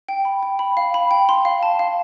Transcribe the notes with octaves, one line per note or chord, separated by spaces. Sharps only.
G5
B5
G5
B5
F5
B5
G5
C6
F5
A5
F5